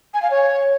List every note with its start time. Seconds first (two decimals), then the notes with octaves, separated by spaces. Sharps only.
0.14 G#5
0.22 F5
0.31 C#5